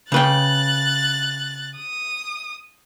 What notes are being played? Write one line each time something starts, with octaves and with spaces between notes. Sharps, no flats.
C#3 B4 G5 F#6 A6
D#6